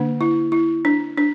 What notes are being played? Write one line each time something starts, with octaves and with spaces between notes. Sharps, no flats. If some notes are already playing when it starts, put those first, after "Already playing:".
Already playing: D3 A#3 D4
E4
E4
D4
D4